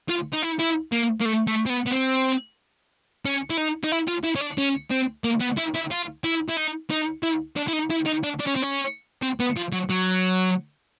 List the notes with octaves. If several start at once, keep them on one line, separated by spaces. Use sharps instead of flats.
F4
D#4
E4
E4
A#3
A#3
A3
A3
C4
B3
B3
C4
C#4
E4
D#4
D#4
E4
F4
E4
C#4
D4
C#4
C4
A#3
B3
E4
E4
F4
E4
E4
D#4
D#4
E4
D4
E4
D#4
E4
D#4
D4
D4
C#4
C4
C#4
C4
B3
F3
F#3
F#3